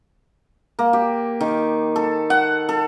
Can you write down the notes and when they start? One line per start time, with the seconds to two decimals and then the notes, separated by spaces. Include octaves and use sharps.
0.79 A#3
0.93 G4
1.41 D#3
1.96 A4
2.30 F#5
2.69 A4